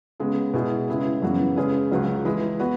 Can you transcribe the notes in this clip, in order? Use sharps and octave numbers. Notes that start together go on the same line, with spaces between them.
C#3 G#3 B3
B2 G#3 E4 G#4
C#3 G#3 E4 B4
F#2 C#3 E3 B3 F#4
C#3 G#3 C#4 G#4 B4
C#2 C#3 F#3 C#4
E3 G#3 E4 G#4 B4
B3 F#4 B4